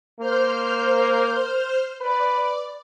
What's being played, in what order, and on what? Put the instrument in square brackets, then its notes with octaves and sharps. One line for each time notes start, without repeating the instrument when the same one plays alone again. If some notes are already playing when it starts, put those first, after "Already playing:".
[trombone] A#3 [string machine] C5 F6 G6
[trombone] B4 [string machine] D5